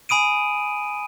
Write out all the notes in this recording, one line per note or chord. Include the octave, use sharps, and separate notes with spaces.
G#5 B5 D#6 D7 D#7